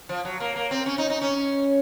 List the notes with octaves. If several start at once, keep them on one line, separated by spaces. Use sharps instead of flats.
F3
F#3
A#3
A#3
C4
C#4
D#4
D#4
C#4